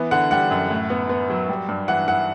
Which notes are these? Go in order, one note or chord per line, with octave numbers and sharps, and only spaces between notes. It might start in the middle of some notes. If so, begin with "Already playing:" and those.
Already playing: E3 B3
D3 F#5
G3 F#5
F#2
A2
B3
B3
F#3
G3
G2
E3 F#5
E3 F#5